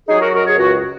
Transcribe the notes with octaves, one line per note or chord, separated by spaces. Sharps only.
F#3 D#4 G#4
F#4 A#4
F#2 F#4 A#4
G#4 C#5
C#2 F#4